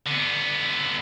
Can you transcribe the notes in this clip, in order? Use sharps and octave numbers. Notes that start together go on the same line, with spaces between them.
D3 B3